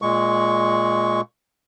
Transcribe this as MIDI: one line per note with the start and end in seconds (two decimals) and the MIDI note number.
0.02 1.21 46
0.02 1.21 56
0.02 1.21 85